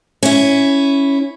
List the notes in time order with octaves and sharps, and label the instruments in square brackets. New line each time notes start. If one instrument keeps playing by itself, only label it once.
[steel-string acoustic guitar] C#4 E4